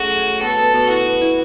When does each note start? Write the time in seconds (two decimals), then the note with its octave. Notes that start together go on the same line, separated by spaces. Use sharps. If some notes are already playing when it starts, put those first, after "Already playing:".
Already playing: A3 C#4 F#4 G#4
0.10 F#3
0.26 A3
0.42 B3 A4
0.58 B3
0.74 B2
0.89 E4 F#4
1.06 B4
1.21 E4